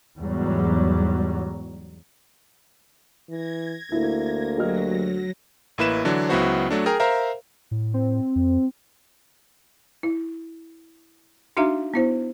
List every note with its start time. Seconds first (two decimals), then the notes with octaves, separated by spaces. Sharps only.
0.18 E2 G#2 F#3 G3
3.29 E3 G#6 A#6
3.92 D2 A#3 E4
4.58 F#3 G4 D#5 F6 A#6
5.78 A1 A#3 E4 B4 E7
6.05 D3 E3 F#3 D4
6.29 C#2 F#3 B3 E4 F#4 C5
6.70 F#3 A3 D4
6.86 G#4 A#4 G5 A#5
7.00 A#4 C5 E5 F5 A#5
7.71 A2
7.94 C4
8.36 F2
10.03 E4
11.57 D4 D#4 F#4 E5 F5 A#5
11.94 B3 E4 C5